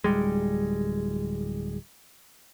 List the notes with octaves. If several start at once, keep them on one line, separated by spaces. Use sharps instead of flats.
D1 D#2 G3 G#3